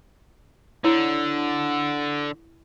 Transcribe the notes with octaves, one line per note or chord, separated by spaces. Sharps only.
D3 E4 C#5